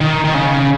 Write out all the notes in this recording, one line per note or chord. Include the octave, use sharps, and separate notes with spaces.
D#3
D#3
C#3